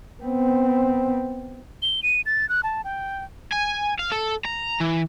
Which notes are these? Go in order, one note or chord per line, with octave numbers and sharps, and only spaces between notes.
B3 C4
G7
D#7
A6
F#6
A5
G5
G#5
F5
A4
A#5
E3